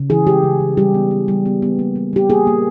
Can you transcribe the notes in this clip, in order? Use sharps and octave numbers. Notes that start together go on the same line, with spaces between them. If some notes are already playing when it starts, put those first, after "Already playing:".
Already playing: C#3
E3 G#4
G#3 G4
C#3
C#3
G3 G4
B3
B3
G3
B3
B3
A#3
G3
G3 G4
A#3 G#4
A#3